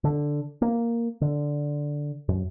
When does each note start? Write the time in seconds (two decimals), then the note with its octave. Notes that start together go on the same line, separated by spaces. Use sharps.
0.04 D3
0.62 A#3
1.21 D3
2.29 F#2